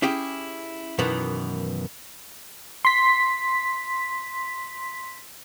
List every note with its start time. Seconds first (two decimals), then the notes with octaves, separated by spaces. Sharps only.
0.02 C#4 E4 G4 G#4 G5
0.99 F#2 B2 D#3 E3 B3
2.85 C6 B6